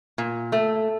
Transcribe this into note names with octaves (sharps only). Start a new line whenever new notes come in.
A#2
A3